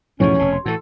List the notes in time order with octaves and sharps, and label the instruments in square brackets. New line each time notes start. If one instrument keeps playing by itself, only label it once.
[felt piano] B1 E2 A2 [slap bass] E3 F3 G#3 [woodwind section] C#4 C#5
[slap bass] F1 B2 [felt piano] A5
[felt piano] C6
[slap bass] A2 E3 [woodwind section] F#4 A4